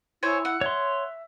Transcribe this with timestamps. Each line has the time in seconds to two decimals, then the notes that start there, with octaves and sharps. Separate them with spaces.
0.23 E4 C5 C#5 G#5
0.45 F#5
0.61 C#5 E5 C6